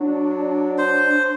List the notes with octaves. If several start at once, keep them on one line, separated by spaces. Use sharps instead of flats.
F#3 D4
C5